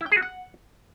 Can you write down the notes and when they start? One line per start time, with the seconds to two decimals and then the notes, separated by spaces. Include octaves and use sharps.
0.01 E4
0.06 G5
0.12 G#4
0.17 F#4
0.22 F#5